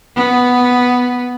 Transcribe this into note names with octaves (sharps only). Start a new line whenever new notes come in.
B3